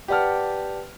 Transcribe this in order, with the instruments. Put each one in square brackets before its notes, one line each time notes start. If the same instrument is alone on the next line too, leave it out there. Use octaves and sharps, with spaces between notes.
[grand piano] G4 B4 D5 F#5 A5 F6